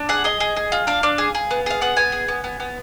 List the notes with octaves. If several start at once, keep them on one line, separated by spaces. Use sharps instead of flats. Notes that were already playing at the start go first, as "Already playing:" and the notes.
Already playing: D4
G#4 F#5
G#4 D#5
G#4
G#4
F4
D4 F5
D4
G#4
G#4
B3
G#4 F5
B3 F#5
B3 G#5
G#4
B3
B3
B3